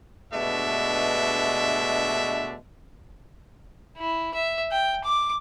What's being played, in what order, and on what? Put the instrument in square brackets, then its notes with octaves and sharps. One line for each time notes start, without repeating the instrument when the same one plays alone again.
[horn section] G2 B2 G#3 A3 D4 E5
[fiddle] E4
E5
G5
D6